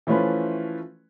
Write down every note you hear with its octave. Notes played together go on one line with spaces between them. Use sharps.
E3 F3 A3 C#4 F4 B4